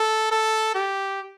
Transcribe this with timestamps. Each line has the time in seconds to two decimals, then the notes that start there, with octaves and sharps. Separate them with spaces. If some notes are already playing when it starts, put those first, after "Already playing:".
Already playing: A4
0.32 A4
0.75 G4